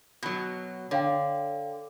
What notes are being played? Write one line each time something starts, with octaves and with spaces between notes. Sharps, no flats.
B2 F#3
D3 C#5 F5 G5